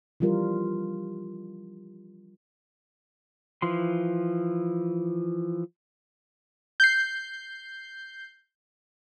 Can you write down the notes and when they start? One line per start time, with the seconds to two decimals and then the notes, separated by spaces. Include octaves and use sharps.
0.20 E3 F3 G3 F4 A#4
3.62 E3 F3 C6
6.80 G6 C7